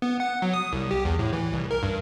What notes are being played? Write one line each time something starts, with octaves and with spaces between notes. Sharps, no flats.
B3
F#5
F#3
D#6
C2
G4
E2
A2
E3
C2
A#4
G2